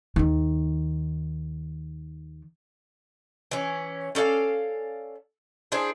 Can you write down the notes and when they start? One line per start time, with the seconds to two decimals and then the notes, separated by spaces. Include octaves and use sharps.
0.16 D#2 D#3
3.51 E3 C#4
4.15 C#4 A4 D5 F5
5.72 D4 E4 G#4 C5